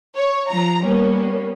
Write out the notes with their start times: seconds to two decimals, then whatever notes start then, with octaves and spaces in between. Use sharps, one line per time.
0.15 C#5
0.49 F3 A#5
0.83 G3 A#3 B3 C#4